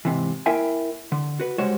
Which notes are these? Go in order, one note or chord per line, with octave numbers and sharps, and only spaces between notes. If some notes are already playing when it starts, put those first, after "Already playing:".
G#2 C3 E3
A#3 E4 A#4 E5 G5 G#5
D3
F#4 B4
C#2 G3 G#3 F#4 C5 C#5